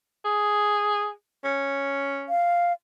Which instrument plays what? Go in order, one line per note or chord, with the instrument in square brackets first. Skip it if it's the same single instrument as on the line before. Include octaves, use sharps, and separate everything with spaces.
[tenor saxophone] G#4
C#4
[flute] F5